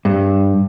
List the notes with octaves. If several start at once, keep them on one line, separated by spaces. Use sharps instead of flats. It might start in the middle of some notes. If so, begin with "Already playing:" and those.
G2